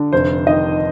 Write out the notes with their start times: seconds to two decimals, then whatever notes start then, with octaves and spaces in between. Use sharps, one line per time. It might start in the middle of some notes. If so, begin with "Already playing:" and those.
Already playing: D3
0.13 F1 C5
0.46 D#3 D#5